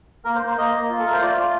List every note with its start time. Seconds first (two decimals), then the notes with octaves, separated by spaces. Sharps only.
0.25 A#3 A#4
0.35 C5
0.41 A#3
0.47 C5
0.57 A#3 D#5
0.73 A#3
0.89 F4
0.98 A4
1.06 A3 A#4
1.13 C5
1.21 F4 D5
1.38 F4